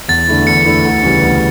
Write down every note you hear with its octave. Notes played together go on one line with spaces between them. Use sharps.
E2 A6
D3 A3 E4
E2 C#7
D3 A3 E4
D2
C#3 E3 G3 C#4
D2